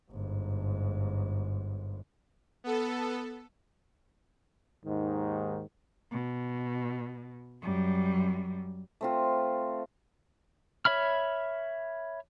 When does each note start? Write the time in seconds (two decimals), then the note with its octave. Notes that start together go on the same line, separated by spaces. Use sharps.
0.11 G1 G#2
2.64 B3 A4
4.85 D#2 G#2 D#3
6.11 B2
7.62 F#2 G3
9.01 A3 C4 F4
10.85 C#5 E5 B5 F6